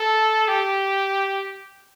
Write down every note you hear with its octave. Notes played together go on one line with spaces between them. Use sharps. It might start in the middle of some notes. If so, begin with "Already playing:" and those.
Already playing: A4
G4